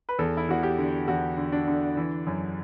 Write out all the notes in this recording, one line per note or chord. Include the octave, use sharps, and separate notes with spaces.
B4
E2 A4
E4
E2 F#4
G4
D3
E2 F#4
D3
D4
D3
E3
F#2